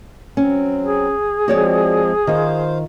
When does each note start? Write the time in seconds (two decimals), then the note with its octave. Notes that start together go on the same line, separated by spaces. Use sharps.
0.37 F#3 C4 C#4
0.84 G#4
1.48 F3 G#3 C4 F#4 C#5 D5
2.27 D#3 F4 C5 F5